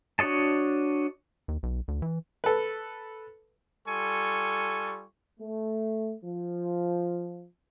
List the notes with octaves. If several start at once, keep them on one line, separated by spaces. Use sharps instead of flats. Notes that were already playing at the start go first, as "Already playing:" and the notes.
D4 F#4 C#5 D#5 A5
D#2
B1
D2
E3
A4 B4
G3 F4 A4 G#5 C#6
A3
F3